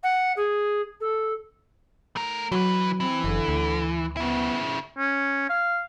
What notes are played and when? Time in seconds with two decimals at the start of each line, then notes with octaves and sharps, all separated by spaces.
0.03 F#5
0.36 G#4
1.00 A4
2.16 A3 A#4
2.52 E3 F#3 B4
3.00 E3 C4
3.24 F#1 D3
3.49 D2
4.17 C#3 B3 E4
4.97 C#4
5.50 F5